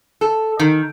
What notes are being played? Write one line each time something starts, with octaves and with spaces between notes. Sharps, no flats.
A4
D#3